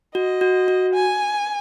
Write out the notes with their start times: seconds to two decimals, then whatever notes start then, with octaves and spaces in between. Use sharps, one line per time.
0.15 F#4 D#5
0.41 F#4
0.68 F#4
0.94 G#5